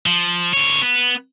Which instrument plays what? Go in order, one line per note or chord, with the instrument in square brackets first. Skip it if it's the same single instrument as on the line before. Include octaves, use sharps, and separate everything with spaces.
[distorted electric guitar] F3
D3 C#5
B3